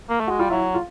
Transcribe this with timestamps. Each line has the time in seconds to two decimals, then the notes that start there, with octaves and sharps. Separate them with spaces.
0.09 A#3
0.20 A3
0.28 G#3 F#4
0.39 G3 F4
0.50 F#3 E4
0.74 F4